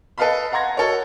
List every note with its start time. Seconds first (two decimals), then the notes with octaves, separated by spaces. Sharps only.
0.18 A4 B4 D#5 F5 A5 B5
0.52 F5 F#5 A#5 C6 G#6 A#6
0.76 F#4 A4 A#4 C#5 D#5